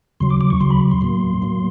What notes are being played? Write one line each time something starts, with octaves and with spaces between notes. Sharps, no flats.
D#2 C#3 F#3 C6
D6
D6
C#6
D#2 C#3 F#3 C6
B5
C6
A2 F#3 A#3
A2 F#3 A#3